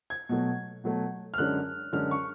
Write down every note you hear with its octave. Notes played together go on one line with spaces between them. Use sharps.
G#6
B2 F#3 A3
B2 F#3 A3
F6
F#2 D3 G#3 C#4 F#6
F#2 D3 G#3 C#4 F6
C#6